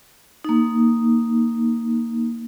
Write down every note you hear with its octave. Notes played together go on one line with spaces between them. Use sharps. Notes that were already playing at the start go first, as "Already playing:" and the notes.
A#3 D#4